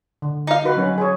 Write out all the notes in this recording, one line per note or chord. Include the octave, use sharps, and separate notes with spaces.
D3
D#4 F5
F#4 B4
F#3 C#4 B4
G#4 C#5